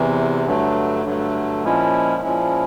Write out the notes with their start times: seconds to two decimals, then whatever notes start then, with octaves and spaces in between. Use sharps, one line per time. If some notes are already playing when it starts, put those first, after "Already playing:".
Already playing: E2 C3 E3
0.46 G2 D3 F#3 A3
1.05 G2 D3 F#3 A3
1.64 A#2 F3 G#3 C#4 E4
2.22 A#2 F3 G#3 C#4 E4